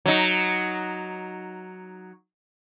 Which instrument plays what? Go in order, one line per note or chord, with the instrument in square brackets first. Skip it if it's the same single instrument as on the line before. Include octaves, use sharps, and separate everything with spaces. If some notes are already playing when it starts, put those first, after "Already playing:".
[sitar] F#3 D#4